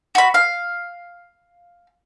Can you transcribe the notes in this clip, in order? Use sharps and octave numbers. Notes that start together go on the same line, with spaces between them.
F#4 B5
F5